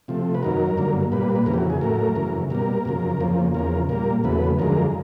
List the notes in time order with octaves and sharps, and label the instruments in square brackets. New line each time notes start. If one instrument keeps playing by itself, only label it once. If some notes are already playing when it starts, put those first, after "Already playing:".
[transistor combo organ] C3 F3 A3
B4
F#2 D#3 F#3 A#4
G2 D3 F#3 A#3
A#2 G3 A#3 B4
B4
F2 C#3 E3 A#4
G4
F#4
G#4
A2 F#3 A3 A#4
F#2 C#3 E3
B2 G3 A#3 A#4
F#2 C#3 F3
F2 C#3 F3 A#3
E2 C#3 F3 A#4
A#2 G3 A#3 A#4
E2 C#3 F#3 A3 B4
F#2 D3 F3 G#3 A#4